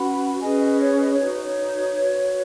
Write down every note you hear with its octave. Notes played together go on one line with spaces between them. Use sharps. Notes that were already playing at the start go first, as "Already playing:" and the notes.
Already playing: C#4 F#4 B4 F#5 B5
C#4 G#4 B4 D#5 G#5
D#5
C#5
D#5
C#5
D#4 F#4 B4
C#5
F#4 B4